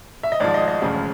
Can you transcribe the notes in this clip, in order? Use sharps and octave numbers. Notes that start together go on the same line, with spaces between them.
E5
D#5
G#1 G#2 F3 D5
D#5
D#5
E1 D2 C#3 F3 G#3